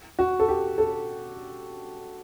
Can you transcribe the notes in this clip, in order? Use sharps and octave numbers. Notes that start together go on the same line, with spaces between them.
F#4
A4
G4
A4